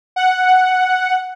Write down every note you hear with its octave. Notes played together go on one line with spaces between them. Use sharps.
F#5